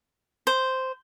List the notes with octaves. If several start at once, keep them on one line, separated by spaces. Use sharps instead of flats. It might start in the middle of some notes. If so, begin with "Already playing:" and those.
C5